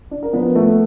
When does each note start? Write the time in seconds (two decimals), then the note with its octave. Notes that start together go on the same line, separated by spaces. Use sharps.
0.11 D4
0.23 A#4
0.33 F3 B3 B4
0.55 A3